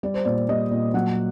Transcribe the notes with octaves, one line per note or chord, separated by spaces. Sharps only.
G3 D5
C5
A#2 D5
G3 D#5
A#2
F#3 F#5